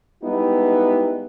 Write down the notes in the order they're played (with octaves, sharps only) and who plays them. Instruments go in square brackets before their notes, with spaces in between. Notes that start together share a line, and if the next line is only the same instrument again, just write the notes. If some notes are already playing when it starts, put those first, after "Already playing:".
[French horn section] G3 G#3 B3 D#4 E4 G4